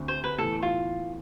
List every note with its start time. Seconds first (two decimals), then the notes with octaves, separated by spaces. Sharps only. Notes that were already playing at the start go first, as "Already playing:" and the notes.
Already playing: D2 D3 A3 C4
0.08 C5
0.24 B4
0.38 A2 E3 B3 A4
0.62 F4